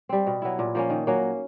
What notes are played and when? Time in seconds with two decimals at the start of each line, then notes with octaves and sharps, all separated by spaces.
0.09 G3 C4
0.26 B2
0.42 F#3 B3 E4
0.59 A#2
0.75 F3 A#3 C#4
0.90 D#3
1.07 F#3 A#3 C#4